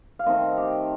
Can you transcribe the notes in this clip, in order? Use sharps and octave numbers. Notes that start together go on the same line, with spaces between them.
F5
D#3 A3 C4 D#4 C5 D#5
G4